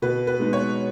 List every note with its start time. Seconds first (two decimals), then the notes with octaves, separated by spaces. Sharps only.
0.02 B2 B4
0.27 B4
0.40 G#3 B3 D#4
0.53 C#5